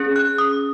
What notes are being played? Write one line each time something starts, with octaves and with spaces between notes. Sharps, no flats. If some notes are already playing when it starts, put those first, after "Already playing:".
Already playing: C#4 G#4
F#6
D#6